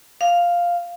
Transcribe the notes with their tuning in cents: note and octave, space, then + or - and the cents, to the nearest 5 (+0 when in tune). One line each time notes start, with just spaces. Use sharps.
F5 +0